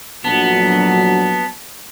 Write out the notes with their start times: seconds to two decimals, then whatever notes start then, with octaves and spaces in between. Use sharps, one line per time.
0.24 A#1 D3 F#3 B3 A5